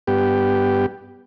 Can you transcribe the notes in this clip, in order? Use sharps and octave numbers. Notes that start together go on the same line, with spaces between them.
G2 B3 G4